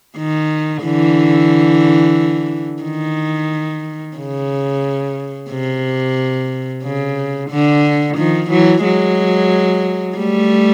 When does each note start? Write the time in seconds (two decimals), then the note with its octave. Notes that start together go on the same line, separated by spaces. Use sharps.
0.18 D#3
0.83 D3 E3
2.83 D#3
4.17 C#3
5.50 C3
6.83 C#3
7.50 D3
8.17 D#3 F3
8.50 E3 F#3
8.84 F#3 G#3
10.17 G3 A3